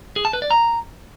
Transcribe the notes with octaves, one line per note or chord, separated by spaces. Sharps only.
G#4
A5
B4
D5
A#5